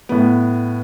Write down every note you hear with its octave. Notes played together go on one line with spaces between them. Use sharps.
A2 B3